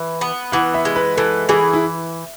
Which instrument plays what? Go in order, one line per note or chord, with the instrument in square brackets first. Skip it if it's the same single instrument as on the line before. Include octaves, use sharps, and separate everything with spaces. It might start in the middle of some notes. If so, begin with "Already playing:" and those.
Already playing: [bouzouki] E3
B3
[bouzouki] E3 [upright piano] F#5
[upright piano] E5
[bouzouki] G#3
[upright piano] B4
[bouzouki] E3 [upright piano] A4
[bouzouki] E3 [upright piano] G#4
[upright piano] E4